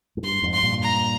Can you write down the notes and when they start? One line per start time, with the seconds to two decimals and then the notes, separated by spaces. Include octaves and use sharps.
0.17 G#2
0.23 G2 C6
0.43 F2 G#2
0.53 C6
0.63 G2 A#2
0.82 A#5